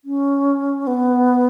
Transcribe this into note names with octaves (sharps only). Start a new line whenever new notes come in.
C#4
B3